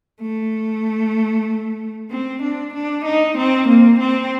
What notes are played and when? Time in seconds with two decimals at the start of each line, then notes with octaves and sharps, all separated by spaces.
0.21 A3
2.10 C4
2.43 D4
2.74 D4
3.05 D#4
3.38 C4
3.68 A#3
4.00 C4